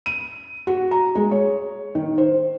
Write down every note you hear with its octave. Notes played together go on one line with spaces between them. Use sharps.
D#7
F#4
A#5
G#3
C#5
D#3
C5